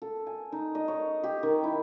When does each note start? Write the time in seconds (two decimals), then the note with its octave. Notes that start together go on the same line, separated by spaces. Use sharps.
0.02 A4
0.27 G#5
0.52 D#4
0.75 D#5
0.88 C#5
1.24 G4
1.43 D#3
1.64 E4